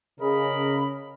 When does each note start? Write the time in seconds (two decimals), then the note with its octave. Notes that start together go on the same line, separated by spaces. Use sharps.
0.20 C#3 A#4 D#5 B5